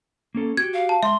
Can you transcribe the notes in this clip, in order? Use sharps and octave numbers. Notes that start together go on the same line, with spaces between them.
A#3 C#4 A4
F#4 G4 G#6
F5
A5
G#3 E5 C6